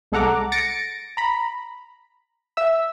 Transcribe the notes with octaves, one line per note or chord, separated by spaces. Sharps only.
C2 G#3 A4 F#5 A#5 D6
A6 A#6 C#7 D7
A#5 B5
E5 E6